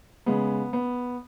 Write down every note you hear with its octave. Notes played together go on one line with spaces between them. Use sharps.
C#3 G#3 B3
B3